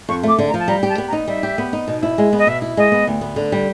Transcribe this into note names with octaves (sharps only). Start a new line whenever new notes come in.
F2 C#6
A3 D6
D3
A#5
F3 A5
G3 A#5
G4
A5
B3
A#5
D#4
G3 E5
G4
B3
D#4
B2
E4
G#3
B3
D#5
B2 E5
E4
G#3 D#5
B3
D2
B3
D3
G3